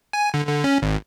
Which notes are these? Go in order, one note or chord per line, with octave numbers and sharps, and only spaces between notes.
G#5
D3
D3
C#4
G#1